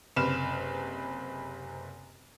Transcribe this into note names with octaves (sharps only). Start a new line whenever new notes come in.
F#1 C3 B4 F6 E7